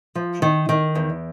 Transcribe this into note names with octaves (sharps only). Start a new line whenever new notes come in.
F3
D#3
D#3
E2